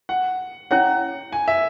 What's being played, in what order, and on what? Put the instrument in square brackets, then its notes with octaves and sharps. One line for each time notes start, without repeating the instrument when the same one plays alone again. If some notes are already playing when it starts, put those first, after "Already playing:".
[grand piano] F#5
[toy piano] C#4 E4 C#5 [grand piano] F#5
[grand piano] G#5
E5